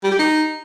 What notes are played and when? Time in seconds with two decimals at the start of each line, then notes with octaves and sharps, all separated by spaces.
0.04 G3
0.11 G4
0.19 D#4